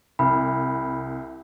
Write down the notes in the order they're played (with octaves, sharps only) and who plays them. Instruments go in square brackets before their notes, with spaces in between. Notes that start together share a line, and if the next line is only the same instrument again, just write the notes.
[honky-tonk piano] C2 [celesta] B5